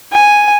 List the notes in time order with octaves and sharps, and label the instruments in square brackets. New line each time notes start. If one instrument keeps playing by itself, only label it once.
[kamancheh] G#5